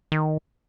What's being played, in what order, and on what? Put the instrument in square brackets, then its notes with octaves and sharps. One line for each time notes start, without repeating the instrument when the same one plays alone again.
[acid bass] D#3